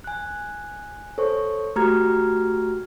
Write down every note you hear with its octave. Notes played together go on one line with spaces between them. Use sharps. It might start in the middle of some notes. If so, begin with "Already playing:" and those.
G#5 F#6
A4 C5 C#5 C#6
A3 F#4 G4 A#5 F6 G#6